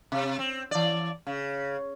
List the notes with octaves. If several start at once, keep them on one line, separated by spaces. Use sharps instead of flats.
C3
C4
E3 D5
C#3